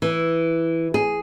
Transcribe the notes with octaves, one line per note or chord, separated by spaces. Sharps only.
E3
G#4